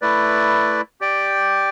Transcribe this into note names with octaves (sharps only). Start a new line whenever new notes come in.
A3 E4 B4 D5
G4 D5 G5